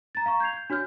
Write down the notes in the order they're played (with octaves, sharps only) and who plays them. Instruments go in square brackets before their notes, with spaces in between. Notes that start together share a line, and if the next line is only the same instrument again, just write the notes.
[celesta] A#5 A6
F5 A#5 C#6
G6 G#6 C7 F7
G6
D4 F#4 C#5 F6 G6